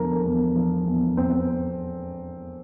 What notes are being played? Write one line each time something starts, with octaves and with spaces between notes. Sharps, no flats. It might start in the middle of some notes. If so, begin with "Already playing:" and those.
Already playing: E2 D3 F3 A#4
E2
F3
E2
E2 C4